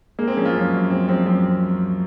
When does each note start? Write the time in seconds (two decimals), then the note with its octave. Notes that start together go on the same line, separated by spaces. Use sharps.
0.19 G#3 A#3
0.28 C4
0.36 F3 C#4
0.45 F4
0.54 F#2 C#4
0.73 F#2
0.90 G#3 C4
1.09 F3 C4
1.26 F#2 C4